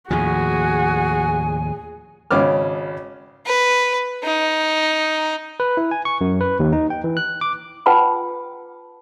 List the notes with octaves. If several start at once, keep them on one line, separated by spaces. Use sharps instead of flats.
D#2 A2 F3 F#4 G#4 G#5
G#1 C#3 C#4 D6 F6
B4
D#4
B4
E4
G#5
C#6
F#2
B4
D#2
D#4
G5
E3
F#6
D6
F4 B4 F#5 G5 A5 B5